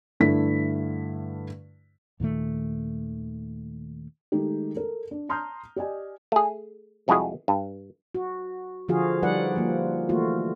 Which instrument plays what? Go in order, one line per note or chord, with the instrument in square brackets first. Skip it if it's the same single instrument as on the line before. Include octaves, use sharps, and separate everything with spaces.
[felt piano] G2 D3 A3 E4 B6
[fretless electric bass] D#2 A#2 D#3 A3
[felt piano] D#3 G#3 A3 D#4 G4
A4 A#4
D4
A5 A#5 C6 D#6 F6 G6
G4 D5 D#5 G#5
[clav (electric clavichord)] A3 G#4
C2 F2 G#3 E4 F#4 G#4
G2
[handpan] F#4
D3 F3 F4 F#4 G#4 F5
F3 G3 D#4 B4 D5 F#5
F3 A#3
E3 A3 A#3 F4 F#4